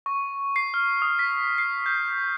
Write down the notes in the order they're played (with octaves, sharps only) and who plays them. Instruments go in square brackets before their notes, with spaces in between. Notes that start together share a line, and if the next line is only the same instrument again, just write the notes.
[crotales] C#6
C7
F6
D#6
B6
C7
G6